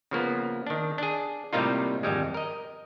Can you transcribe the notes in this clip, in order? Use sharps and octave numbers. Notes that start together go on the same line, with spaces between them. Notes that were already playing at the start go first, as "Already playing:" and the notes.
C#3 F3 A#3 B3
D#3 D4
D4 G#4
A2 C3 G3 A#3 D#4 F4
G#1 F2 G3 G#3
A#4 D#5